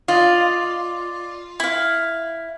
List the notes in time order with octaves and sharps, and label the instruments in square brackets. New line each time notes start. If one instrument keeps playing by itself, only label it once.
[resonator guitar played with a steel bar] F4 [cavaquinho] D5 D#5
[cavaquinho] E4 F5